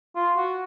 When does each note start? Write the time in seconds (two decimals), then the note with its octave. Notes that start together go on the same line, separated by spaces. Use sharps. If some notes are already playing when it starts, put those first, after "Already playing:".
0.15 F4
0.37 F#4